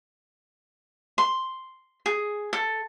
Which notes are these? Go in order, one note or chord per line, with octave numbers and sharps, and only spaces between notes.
C6
G#4
A4